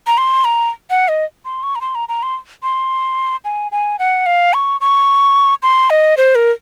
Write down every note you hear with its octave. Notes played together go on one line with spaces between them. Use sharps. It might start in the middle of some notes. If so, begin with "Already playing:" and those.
A#5
C6
A#5
F#5
D#5
C6
C#6
A#5
C6
A#5
A#5
C6
C6
G#5
G#5
F#5
F5
C#6
C#6
C6
D#5
C5
A#4